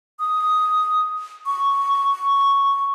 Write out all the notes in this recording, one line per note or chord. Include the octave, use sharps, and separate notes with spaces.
D#6
C#6